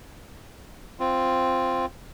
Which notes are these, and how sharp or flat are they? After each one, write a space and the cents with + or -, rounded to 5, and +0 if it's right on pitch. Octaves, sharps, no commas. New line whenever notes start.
C4 +0 F4 -5